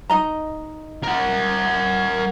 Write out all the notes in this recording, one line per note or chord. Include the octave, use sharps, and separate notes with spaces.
D#4 D#5 A#5
A#4 F#5